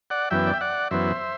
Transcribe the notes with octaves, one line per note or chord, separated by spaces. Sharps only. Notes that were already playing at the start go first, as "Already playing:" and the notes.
D5 F#5
F#2 E3 B3 E5 G5
D5
E5
D5 F#5
F#2 E3 B3 C5 E5